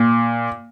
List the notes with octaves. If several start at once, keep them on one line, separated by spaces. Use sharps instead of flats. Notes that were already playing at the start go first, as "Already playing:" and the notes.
Already playing: A#2